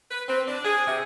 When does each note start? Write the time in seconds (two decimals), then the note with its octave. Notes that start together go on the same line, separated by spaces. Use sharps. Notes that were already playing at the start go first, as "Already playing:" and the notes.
0.10 B4
0.28 C4
0.48 D4
0.65 G#4
0.87 C3